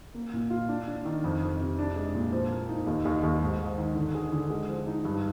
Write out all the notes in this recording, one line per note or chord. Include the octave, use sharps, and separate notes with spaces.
A#3
A#2
F4
D4
D4
D#3
F2
F2
C3
D4
G#3
A#2
F3
A#3
D#4
D#2
D#2
D#2
G#2
G#2
D#3
D3
G#4
D3
G#3
F3
D#4
G2